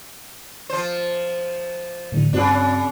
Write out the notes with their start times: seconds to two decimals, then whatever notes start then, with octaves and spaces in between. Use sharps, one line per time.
0.69 F3 C5
2.12 A2 D3 E3
2.33 G2 C#3 C4 D4 F#4